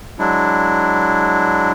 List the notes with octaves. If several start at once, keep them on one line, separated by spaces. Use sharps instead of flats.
F#3 G#3 D4 E4